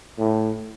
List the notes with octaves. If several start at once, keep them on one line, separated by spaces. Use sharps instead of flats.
A2